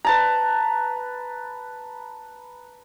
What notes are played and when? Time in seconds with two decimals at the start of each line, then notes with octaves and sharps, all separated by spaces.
0.05 B4 A5 A#5